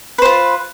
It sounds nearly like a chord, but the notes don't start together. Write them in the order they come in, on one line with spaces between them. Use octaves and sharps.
B4 C5 F4